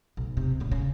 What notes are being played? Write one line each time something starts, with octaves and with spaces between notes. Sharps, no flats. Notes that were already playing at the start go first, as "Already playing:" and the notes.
B1
C3
A#1 C#3
C#3